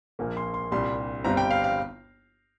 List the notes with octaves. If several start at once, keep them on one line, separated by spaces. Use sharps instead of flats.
A#1 A#2 F3 A#3
C6
C6
C2 A#2 G3 D4 C6
G1 G2 G3 C4 A#5
G5
F5
F5